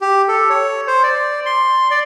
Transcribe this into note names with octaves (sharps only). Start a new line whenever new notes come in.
G4
A4
C#5
C5
D5
C6
D5